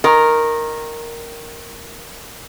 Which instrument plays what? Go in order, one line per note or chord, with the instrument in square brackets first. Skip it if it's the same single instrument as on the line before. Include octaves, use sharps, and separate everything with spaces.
[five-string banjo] D#3 [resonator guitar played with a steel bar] A#4